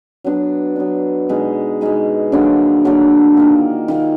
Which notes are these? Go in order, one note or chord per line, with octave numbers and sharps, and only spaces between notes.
F#3 B3 D4
F#3 B3 D4
B2 G#3 D#4 G#4
B2 G#3 D#4 G#4
D3 F#3 A#3 D4
D3 F#3 A#3 D4
D#3 A#3 F4
D#3 A#3 F4